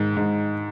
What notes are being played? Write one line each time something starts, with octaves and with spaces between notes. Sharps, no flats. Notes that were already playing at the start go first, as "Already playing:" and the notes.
Already playing: G#2 D#3
G#2